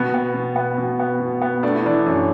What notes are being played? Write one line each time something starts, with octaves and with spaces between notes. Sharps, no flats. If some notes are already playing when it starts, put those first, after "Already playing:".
Already playing: B2 B3
B3
B2
B3
B2
B3
B2
B3
A3 D4
E4
E3 D4
F#2